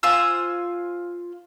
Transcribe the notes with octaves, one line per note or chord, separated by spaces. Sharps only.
F4 C5 G#5 E6